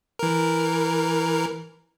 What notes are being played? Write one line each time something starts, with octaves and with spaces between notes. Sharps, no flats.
E3 A#4